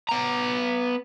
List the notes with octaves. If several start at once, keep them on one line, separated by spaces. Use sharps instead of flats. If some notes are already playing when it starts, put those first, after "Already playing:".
B3 A#5